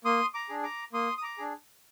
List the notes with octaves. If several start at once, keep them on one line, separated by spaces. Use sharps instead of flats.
A#3 C6 D#6
A#5 D6
D4 G#4
A#5 D6
A#3 C6 D#6
D#6
A#5 D6
D4 G#4